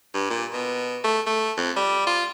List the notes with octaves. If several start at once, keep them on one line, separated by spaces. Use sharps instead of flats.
G2
A#2
B2
A3
A3
F2
G3
F4